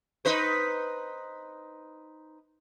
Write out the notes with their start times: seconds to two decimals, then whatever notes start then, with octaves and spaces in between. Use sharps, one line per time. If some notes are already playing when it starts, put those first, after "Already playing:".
0.25 D#4 B4 C5